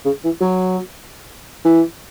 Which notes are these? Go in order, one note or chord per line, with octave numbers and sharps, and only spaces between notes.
C#3
E3
F#3
E3